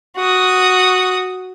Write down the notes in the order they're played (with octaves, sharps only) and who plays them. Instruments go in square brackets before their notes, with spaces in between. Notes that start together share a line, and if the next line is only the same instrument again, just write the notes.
[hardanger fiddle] F#4 D#6